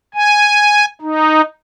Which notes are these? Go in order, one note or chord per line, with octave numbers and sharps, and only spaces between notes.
G#5
D#4